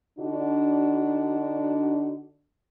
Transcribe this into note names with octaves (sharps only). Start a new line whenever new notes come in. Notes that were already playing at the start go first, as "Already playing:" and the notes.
D3 D4 D#4 F#4